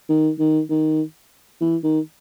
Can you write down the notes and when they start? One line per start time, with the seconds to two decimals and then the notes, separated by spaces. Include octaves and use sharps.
0.09 D#3
0.39 D#3
0.70 D#3
1.61 E3
1.84 D#3